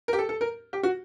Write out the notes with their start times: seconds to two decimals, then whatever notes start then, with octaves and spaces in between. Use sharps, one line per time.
0.08 A#4
0.13 G4
0.19 A4
0.29 A4
0.41 A#4
0.73 G4
0.83 F#4